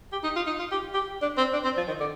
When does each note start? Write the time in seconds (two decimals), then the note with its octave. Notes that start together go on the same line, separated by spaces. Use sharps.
0.12 G4
0.24 D#4
0.36 F4
0.47 D#4
0.59 F4
0.71 G4
0.94 G4
1.22 D4
1.38 C4
1.53 D4
1.64 C4
1.77 F3
1.88 D#3
2.00 D3